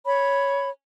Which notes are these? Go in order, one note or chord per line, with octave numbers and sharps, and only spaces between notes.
C#5 B5